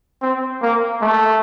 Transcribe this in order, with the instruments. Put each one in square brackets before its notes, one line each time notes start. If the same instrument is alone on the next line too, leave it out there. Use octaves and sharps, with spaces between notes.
[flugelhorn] C4
A#3
A3